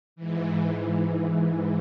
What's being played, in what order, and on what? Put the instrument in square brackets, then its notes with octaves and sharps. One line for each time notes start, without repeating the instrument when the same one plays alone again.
[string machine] G#2 E3